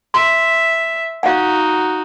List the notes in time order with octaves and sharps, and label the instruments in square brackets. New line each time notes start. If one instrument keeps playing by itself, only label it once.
[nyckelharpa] E5 [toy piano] C6
[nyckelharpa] D#4 F#4 [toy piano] F5 F#5